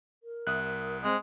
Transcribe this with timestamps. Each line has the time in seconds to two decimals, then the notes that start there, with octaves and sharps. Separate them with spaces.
0.23 A#4
0.47 C2 E5 D#6 F#6
1.04 G#3 C4